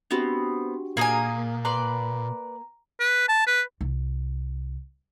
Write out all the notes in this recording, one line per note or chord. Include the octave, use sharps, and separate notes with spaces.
B3 C4 D4 F#4 G4
A#2 A#3 G#4 A#4 G#5 D#6
B4 D5 A#5 C6
B4
A5
B4
C2